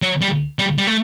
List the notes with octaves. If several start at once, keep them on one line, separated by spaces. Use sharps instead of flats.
F#3
G3
G3
G3
A3